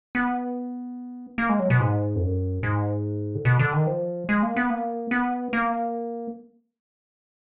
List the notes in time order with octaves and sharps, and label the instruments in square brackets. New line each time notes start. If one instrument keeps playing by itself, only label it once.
[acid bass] B3
A#3
G#3
F#3
B2
G#2
F2
F#2
G#2
D3
B2
D3
D#3
F3
G#3
A#3
B3
A#3
B3
A#3